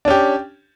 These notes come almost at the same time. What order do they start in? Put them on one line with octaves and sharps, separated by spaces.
D4 C#4 G4